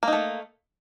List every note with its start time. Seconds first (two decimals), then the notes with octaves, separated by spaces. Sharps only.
0.03 A#3
0.08 D#4
0.13 A3